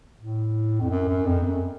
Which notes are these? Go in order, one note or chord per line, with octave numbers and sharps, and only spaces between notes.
A2
F2
F#2
F#2
F2
F#2